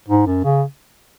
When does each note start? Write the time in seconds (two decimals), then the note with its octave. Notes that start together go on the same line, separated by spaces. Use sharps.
0.08 G#2
0.26 F#2
0.44 C#3